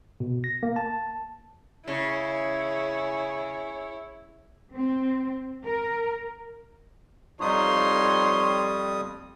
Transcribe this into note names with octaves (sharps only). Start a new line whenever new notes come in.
B2
A#6
A#3
A5
C#3 E4 G#4 C#5
C4
A#4
F2 F3 G3 D#4 C#5 C6 D#6